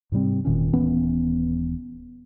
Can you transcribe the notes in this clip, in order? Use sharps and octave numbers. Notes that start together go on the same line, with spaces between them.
G#2 C3 G3 C4
E1 A#2 D#3 C#4
D#1 E3 B3 C#4